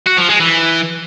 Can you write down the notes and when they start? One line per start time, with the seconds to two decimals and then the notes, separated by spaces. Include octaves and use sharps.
0.06 F#4
0.17 F3
0.29 G#3
0.40 E3